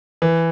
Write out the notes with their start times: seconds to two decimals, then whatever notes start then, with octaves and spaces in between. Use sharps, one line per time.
0.22 E3